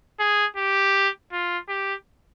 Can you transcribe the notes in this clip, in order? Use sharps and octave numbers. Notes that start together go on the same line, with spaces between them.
G#4
G4
F4
G4